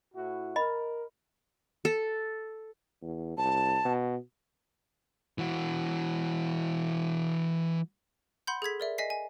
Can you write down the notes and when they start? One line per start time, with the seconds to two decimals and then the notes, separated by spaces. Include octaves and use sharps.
0.14 A2 E4 F#4
0.56 A#4 D#5 B5
1.85 A4
3.02 E2
3.37 C2 A5
3.85 B2
5.38 E3 F#4
8.47 F#5 B5 C6 G6
8.62 G#4 A4 G#6 B6
8.80 A#4 D5 E5
8.98 D#5 G#5 B6 C7
9.10 G#5